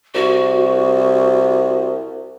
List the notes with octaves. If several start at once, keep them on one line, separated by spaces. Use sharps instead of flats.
C2 F#4